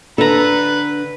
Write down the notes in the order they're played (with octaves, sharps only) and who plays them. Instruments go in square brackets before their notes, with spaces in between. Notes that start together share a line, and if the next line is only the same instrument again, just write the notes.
[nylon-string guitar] D3 [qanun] A4 A#5 [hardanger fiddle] B4